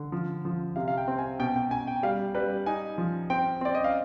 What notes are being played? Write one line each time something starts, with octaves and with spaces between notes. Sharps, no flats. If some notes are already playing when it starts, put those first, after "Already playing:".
Already playing: D3
F3
F3
C3 F5
F5
G5
C4
G#5
B2 G5
G5
B2 G#5
G5
G3 F5
G3 B4
D#4 G#5
F3
C4 G5
C4 D5
D#5
F5